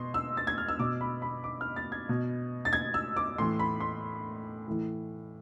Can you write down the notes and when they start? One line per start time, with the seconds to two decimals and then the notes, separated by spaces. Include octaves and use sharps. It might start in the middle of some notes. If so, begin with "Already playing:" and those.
Already playing: B2 C6
0.14 E6
0.37 A6
0.47 G#6
0.58 F6
0.68 E6
0.79 B2 D6
1.01 B5
1.22 B5
1.44 D6
1.61 F6
1.76 A6
1.92 G#6
2.09 B2
2.65 A6
2.73 G#6
2.94 E6
3.17 D6
3.38 A2 E3 C6
3.59 B5
3.80 C6
4.68 A2 E3